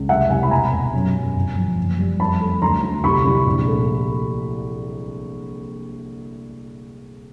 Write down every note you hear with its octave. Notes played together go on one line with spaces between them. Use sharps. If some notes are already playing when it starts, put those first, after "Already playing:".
Already playing: C#2
C2 E5 F#5
C2 F#5 G#5
B5
E1 G#5 A#5
E1
F#2
F#2
G1
F3
F#1
G3
F2 A5 B5
A3
D2 A#5 C6
D2
C2 B5 C#6
C2
A#1
A3